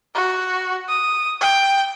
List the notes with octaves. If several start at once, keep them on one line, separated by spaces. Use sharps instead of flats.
F#4
D#6
G5